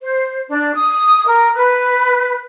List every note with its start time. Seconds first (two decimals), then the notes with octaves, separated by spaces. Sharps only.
0.02 C5
0.49 D4
0.75 D#6
1.26 A#4
1.55 B4